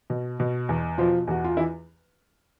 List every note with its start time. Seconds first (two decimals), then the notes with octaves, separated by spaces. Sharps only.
0.10 B2
0.40 B2
0.69 E2
0.98 B2 F3 F4
1.27 E2 F#4
1.44 F4
1.57 E3 E4